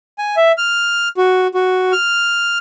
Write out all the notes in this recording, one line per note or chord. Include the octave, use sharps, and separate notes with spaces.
G#5
E5
F6
F#4
F#4
F6